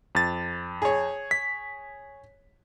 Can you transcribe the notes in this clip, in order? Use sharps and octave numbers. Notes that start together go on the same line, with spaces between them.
F2 A6
G#4 C#5
B6